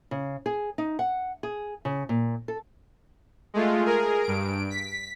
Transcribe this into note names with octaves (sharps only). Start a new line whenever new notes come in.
C#3
G#4
D#4
F#5
G#4
C#3
A#2
A4
G#3 A3 F4
G#4 A#4
G2 D7
B6